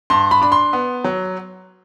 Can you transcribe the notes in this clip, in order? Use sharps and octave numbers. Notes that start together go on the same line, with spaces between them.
G2 C6
B5
D4 B5
C6
B3
F#3